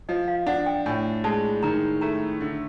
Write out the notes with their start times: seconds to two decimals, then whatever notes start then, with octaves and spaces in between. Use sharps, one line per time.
0.09 F3 D#5
0.28 F5
0.47 D4 F#5
0.66 G5
0.86 A2 G#5
1.24 G#3 A5
1.63 D#3 A#5
2.01 A3 A#5
2.41 D3